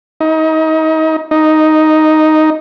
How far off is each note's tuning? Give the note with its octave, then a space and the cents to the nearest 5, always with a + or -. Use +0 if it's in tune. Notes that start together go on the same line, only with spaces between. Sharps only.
D#4 +30
D#4 +0